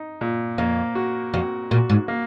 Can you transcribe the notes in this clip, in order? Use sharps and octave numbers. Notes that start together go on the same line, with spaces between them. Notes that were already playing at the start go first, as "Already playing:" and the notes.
Already playing: D#4
A#2
F2 A#3
F#4
F2 F#4
A#2 F#4
G#2
A#3